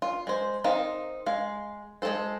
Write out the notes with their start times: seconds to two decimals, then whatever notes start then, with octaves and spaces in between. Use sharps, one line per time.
0.02 F4
0.27 G#3 C5
0.64 C4 D#4 A#4 F5
1.26 G#3 F5
2.02 G#3 A3 F4 A4 C5